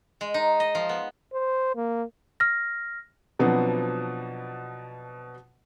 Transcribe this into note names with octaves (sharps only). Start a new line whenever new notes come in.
G#3
D#4
D#5
F3
B3
C5
A#3
F6 A#6
B2 F3 F#3 B3 C4 D4